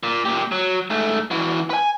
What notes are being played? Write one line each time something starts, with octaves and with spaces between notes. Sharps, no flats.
A#2
A#2 G4
F#3
G#2 A3
E3 F#4
B4 G#5